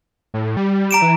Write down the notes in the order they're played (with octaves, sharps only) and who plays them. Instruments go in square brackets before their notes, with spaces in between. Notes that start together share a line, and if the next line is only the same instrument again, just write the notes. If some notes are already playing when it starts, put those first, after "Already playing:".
[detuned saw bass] A2
G3
[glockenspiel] A#5 D7 E7
[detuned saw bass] E3